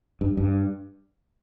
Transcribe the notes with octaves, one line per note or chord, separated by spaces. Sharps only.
G2
G2